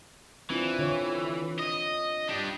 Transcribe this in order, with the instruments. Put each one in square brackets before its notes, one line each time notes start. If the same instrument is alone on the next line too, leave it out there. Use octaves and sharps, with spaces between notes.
[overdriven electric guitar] E3 [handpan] C4 D4 F4
[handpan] D3 F4 C#5
[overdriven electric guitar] D#5
D4 G4